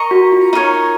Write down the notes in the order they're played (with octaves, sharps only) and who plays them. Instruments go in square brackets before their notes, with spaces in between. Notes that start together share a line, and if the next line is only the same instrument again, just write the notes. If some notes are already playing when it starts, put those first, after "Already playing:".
Already playing: [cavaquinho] A#4 D#5 A#5 C#6
[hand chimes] F#4
F4
[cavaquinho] D#4 A#4 C#5